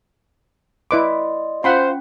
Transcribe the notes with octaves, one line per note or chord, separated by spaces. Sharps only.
E4 B4 D5 D#5 C6 D6
C#4 F4 C5 F#5 G5 B5 C6